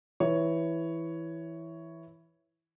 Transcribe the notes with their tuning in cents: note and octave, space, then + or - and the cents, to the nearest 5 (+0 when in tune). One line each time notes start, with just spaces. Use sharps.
E3 +0 C#5 +5